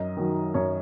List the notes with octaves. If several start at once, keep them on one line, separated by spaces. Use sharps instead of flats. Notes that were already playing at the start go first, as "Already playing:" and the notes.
Already playing: F#2 D#5
D#3 F#3
F#2 C#5